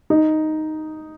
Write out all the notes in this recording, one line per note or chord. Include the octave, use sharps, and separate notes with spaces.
D#4